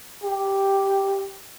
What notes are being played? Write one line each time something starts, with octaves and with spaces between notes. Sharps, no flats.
G4